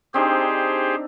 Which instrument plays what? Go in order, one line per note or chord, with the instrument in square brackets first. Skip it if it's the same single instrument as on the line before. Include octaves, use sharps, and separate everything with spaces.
[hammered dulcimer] C4 D4 D#4 [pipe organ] G4 G#4 C5